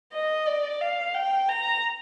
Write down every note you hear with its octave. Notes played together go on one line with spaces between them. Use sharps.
D#5
D5
F5
G5
A#5